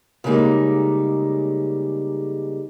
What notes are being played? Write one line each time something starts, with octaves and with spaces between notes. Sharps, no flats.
C#3 G3 G#3 A#3 D#4